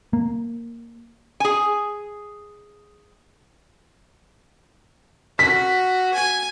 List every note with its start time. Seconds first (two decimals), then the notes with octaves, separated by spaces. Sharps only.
0.13 A#3
1.40 G#4 G#5
5.39 F#4 B6
6.14 G#5